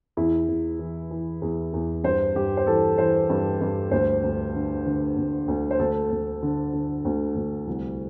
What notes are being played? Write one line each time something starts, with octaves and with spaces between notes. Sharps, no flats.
E2 E4
E2
E3
E3
E2
E2
G2 C5
G2 G4
C5
E3 A4
E3 C5
G2
G2
D2 C5
D2
D3
D3
D2
D2
C5
D2 A4
D2
D3
D3
D2
D2
C2